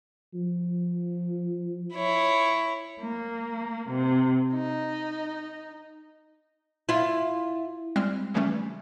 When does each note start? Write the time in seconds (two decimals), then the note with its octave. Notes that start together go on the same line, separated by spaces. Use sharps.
0.34 F3
1.94 E4 C#5
3.01 A#3
3.89 C3
4.53 D#4
6.89 E4 F4
7.96 G3 G#3 C4 F6
8.34 C#3 E3 F3 G3 A3 C#4